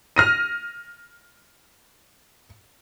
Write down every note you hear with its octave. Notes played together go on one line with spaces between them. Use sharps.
F6 A#6 D#7